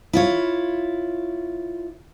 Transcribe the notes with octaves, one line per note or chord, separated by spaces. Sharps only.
E4 F4 C#5